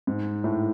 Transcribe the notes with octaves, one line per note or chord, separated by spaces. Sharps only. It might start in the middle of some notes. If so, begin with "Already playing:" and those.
G#2
A2